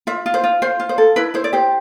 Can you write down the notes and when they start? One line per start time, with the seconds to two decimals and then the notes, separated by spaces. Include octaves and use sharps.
0.07 F4 E5
0.26 F4
0.34 C5
0.44 F4
0.62 F4 C5
0.80 F4
0.89 C5
0.98 A4
1.16 E4 B4
1.34 E4 C5
1.44 D5
1.53 G4 C5